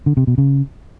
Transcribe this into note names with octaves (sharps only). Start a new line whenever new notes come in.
D3
C3
B2
C#3